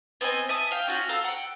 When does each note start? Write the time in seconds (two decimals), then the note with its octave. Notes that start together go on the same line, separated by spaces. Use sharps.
0.21 B3 C4 D#5 G#5
0.49 E5 G#5 A5 D#6
0.71 F5 G5
0.87 C#4 F4 F#4 F6
1.09 A4 F5 A#5 E6
1.24 F#5 G5